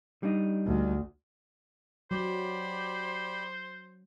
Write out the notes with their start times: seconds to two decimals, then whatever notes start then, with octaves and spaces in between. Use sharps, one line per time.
0.23 G3 D4 D#4
0.67 D2
2.11 F#3 G4 C5 D5 B5